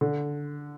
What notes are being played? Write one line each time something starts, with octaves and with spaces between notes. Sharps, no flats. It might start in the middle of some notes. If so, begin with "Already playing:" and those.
D3